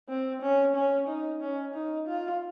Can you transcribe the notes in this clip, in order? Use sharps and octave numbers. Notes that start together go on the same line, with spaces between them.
C4
C#4
C#4
D#4
C#4
D#4
F4